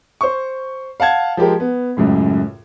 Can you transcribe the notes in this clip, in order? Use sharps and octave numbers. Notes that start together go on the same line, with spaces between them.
C5 C#6
F5 F#5 A5 G#6
F3 G#3 G4 A#4
B3
C#2 F#2 A2